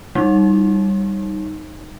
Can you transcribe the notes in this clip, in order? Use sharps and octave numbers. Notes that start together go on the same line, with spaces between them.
G3 D#4